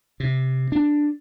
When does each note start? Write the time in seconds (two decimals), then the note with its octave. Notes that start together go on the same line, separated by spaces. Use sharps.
0.20 C3
0.72 D4